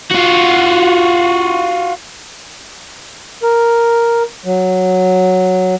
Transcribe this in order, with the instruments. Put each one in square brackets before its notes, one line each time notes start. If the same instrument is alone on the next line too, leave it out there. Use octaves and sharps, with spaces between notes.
[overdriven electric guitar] F4 F#4
[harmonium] A#4
F#3